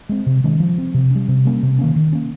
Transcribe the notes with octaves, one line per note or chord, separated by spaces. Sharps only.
G#3 C4
C3
D#3 G#3 C#4
F3
C4
C3
G3 C#4
C3
G3 A#3 C#4
C3
D#3 A#3 C#4
D#3
A#3 C#4